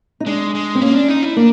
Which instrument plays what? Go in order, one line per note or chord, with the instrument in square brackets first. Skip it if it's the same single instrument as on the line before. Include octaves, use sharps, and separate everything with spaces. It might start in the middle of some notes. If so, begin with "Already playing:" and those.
[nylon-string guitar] D#4
[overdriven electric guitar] G#3 [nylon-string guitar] D4
[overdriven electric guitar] G#3
[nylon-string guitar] C4
[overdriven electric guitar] A#3 [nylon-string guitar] C#4
[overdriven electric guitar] D4
D#4
E4
[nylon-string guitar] A#3 [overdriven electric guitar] D4